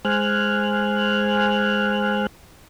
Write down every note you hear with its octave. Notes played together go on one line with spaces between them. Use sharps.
G#3 C5 G#5 F6 F#6